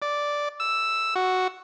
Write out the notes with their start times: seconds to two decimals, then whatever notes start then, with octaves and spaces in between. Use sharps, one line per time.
0.02 D5
0.60 E6
1.16 F#4